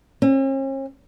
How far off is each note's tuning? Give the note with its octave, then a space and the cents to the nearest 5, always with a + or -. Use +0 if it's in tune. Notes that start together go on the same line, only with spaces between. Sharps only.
C#4 -45